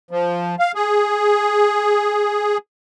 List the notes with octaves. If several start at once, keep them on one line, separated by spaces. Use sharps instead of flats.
F3
F5
G#4